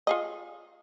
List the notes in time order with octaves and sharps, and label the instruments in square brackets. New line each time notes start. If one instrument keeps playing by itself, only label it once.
[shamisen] F4 G#4 D#5